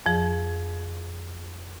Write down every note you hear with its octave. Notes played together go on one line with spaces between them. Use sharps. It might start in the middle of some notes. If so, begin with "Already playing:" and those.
F2 F3 G#4